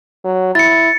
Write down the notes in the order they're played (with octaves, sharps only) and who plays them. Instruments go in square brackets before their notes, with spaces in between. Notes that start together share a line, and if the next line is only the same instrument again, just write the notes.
[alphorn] F#3
[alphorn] E4 [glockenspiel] A6 C#7